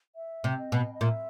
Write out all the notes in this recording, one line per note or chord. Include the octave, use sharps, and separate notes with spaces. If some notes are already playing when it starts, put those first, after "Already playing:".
E5
C3
D#5
B2
D#5
A#2 E5